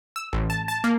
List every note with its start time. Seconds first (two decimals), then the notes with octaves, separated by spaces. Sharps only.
0.16 E6
0.33 A1
0.50 A5
0.68 A5
0.84 A#3